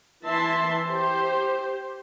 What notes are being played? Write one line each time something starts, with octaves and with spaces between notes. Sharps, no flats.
E3 E4 E5 A5 C6
G4 C5